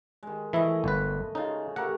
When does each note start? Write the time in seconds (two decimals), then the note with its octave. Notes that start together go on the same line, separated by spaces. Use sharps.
0.23 D#3 G#3
0.53 E3 A3 E4 D#5
0.84 G1 B4
1.35 C#3 D#4 F4
1.76 A3 G4 A#4 F#5